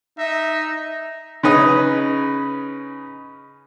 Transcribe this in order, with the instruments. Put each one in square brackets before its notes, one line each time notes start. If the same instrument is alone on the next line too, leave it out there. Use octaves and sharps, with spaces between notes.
[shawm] D#4 [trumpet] E5
[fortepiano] C#3 C#4 D#4 B4 D#6